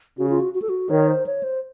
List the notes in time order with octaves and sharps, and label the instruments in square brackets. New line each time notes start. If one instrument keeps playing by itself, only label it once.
[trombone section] C#3 [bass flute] F#4
[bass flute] F4
F#4
F#4
A4
F#4
[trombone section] D#3 [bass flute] C#5
[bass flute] C5
C#5
C5